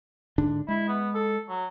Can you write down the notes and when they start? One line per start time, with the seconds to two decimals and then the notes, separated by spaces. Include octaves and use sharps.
0.38 G#2 D3 D4
0.68 G#3 E4
0.88 B3
1.15 A4
1.49 F#3